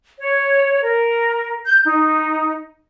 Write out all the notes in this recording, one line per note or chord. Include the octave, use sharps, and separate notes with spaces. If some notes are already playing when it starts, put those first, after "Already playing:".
C#5
A#4
G6
D#4